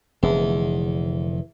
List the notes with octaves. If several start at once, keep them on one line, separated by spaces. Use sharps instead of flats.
F1 E2 D3